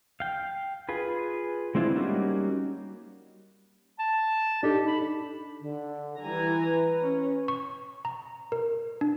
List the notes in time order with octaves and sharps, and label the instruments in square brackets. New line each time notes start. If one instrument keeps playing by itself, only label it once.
[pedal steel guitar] F5 G5
F4 G#4 B4
G#3 C4 D4 E4 F4
G3 A#3 C#4 D#4 F#4
[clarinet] A5
[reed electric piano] D4 D#4 A4 [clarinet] G4
[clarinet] B5
[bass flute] D3
[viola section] E3 G#5 A#5 [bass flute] G3
[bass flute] B4
[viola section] C#4
[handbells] C#6
A#5
A#4
D4